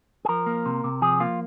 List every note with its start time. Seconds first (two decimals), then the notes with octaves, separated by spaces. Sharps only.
0.25 G#4
0.29 F3 A#4
0.46 A#3
0.66 C3
0.84 C3
1.02 F3 G#4
1.20 A#3 F4